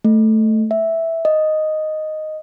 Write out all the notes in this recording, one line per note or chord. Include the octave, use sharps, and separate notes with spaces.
A3
E5
D#5